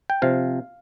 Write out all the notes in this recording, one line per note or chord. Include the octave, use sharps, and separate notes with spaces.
G5
C3 F3 F5